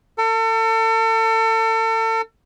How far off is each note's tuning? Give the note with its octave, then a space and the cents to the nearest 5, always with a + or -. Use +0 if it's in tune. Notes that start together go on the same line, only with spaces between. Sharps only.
A4 +35